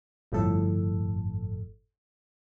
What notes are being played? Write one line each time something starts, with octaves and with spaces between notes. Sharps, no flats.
G1 F2 A2 A4